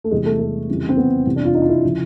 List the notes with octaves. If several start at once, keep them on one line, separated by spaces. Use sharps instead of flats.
A3
E2 C3 E3 G3 G#3
A3
A3
F2 C#3 E3 G3
C4
B3
F2 C3 E3 G3
D4
F4
D#4
F4
E4
C#3 F3